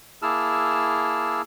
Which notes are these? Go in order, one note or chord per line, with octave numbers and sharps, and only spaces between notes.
A#3 E4 G#4 A5 E6 F6